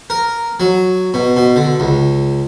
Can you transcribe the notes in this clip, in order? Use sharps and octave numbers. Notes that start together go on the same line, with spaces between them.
A#4
F#3
B2
B2
D3
C#2